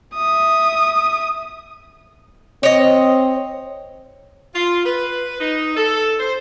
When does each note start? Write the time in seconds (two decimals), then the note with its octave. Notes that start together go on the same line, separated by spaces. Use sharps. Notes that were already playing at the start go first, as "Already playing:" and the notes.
0.15 E5 D#6
2.63 C4 C#5 D#5
4.55 F4
4.85 B4
5.40 D#4
5.77 A4
6.20 C5